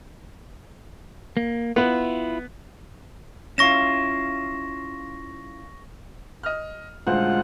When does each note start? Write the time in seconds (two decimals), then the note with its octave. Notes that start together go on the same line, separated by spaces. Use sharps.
1.37 A#3
1.76 B3 E4 F4
3.58 C#4 E4 F4 C#6 A#6 E7
6.43 D#5 F6
7.07 D#1 D2 G#3 F4 C5 F#5